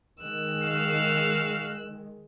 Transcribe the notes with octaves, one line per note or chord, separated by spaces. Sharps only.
D#3 G#3 E6 F#6
F#4 F5